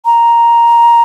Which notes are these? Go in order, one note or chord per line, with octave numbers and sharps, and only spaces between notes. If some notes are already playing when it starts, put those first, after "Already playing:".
A#5